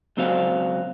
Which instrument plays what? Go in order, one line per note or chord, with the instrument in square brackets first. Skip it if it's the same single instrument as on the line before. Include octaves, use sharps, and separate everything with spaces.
[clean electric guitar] C#2 F#3 C4 F#4 C5 F5